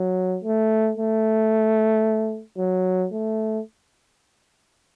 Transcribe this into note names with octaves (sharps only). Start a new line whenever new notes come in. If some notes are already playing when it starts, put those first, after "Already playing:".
Already playing: F#3
A3
A3
F#3
A3